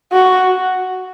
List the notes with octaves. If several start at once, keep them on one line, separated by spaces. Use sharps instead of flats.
F#4